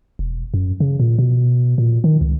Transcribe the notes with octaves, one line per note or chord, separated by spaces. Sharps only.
E1
F#2
C#3
A#2
B2
A#2
D#3
C#2